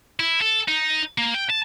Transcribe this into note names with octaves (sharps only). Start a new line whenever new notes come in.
E4
A4
D#4
A#3
G5
A5